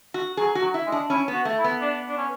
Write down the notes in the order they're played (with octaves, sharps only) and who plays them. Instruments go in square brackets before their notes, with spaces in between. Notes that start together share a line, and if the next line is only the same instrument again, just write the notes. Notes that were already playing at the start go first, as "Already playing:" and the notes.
[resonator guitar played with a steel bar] F#4
[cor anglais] F#3 [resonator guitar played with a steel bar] G#4
[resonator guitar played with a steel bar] F#4
[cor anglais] F#3
[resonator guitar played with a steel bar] E4
[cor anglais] G#3
[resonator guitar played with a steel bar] D4
[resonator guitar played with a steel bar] C#4 [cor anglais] E4
[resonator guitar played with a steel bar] B3
[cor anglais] F#4
[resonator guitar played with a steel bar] A3
[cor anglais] E4
[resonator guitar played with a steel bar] B3
[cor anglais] D4
D4
C#4